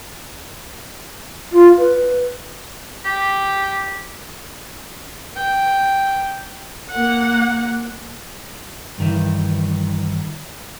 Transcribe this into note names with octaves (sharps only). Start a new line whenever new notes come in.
F4
B4
G4
G5
A#3 F#5
G2 D#3 E3